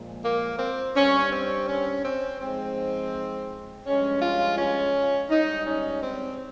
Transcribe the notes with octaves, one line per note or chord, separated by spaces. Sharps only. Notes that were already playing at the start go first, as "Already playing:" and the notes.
Already playing: A#2 F3 G#3
A#3
C4
G2 G3 C#4
C4
C#4
C4
G#2 F3 G#3 C4
G2 F3 G#3 C#4
F4
C#4
G#2 G3 D#4
C#4
C4